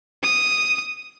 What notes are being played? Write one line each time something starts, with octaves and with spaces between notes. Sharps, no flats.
D#6